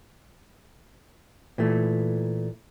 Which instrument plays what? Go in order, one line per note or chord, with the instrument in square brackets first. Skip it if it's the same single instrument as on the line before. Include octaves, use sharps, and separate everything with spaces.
[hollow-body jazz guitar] A#2 E3 A3